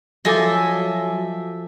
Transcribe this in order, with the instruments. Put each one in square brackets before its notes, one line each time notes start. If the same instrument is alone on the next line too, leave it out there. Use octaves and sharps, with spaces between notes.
[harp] F3 A4 D6 [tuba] F#3 [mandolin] D#5 E5 G#5